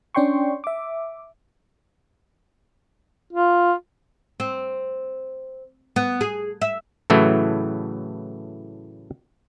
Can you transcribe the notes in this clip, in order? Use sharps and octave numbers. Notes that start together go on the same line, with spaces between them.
C#4 D4 D5 G5 C6 C#6
E5 D6
F4
C4
B3
G#4
E5
A2 C#3 E3 F#3 A3